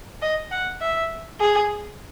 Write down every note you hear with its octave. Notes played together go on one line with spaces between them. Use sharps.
D#5
F#5
E5
G#4